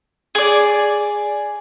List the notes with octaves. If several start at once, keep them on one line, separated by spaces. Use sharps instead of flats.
G#4 D5